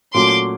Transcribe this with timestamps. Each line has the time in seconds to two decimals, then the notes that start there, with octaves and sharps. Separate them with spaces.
0.14 A#2 F#3 A3 C#4 F#4 C6 D6